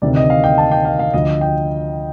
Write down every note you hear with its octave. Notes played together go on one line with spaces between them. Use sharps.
D2 C3 D#3 D5
D#5
F5
G5
A5
G5
F5
F5
D2 D3 F3 D#5
G5